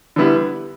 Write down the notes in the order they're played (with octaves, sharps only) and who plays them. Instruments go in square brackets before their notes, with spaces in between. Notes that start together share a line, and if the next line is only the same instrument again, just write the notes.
[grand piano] D3 G3 B3 E4